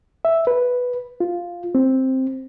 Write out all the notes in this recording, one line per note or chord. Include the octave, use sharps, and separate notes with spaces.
E5
B4
F4
C4